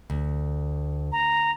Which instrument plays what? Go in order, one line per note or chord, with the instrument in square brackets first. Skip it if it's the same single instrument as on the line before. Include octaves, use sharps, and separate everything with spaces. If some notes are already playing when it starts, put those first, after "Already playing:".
[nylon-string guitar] D2
[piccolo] A#5